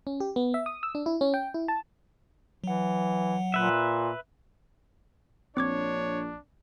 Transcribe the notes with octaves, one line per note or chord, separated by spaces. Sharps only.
C#4
G4
B3
E5
D#6
E6
D4
E4
C#4
G5
E4
A5
E3 F#3 F#5
A#2 B4 E5
A#1 C4 D4 C#5 D6 G#6